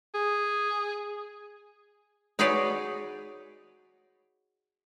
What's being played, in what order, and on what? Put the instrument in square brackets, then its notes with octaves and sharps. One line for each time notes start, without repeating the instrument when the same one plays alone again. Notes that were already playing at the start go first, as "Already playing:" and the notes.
[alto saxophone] G#4
[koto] D#4 F#4 G#4 B4 C#5 D5